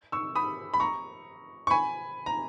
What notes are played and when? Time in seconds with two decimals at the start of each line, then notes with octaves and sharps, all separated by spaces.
0.12 C#6 E6
0.35 B5 D#6
0.74 B5
0.80 A#5 C#6
1.67 C#6
1.71 G#5 B5
2.26 A#5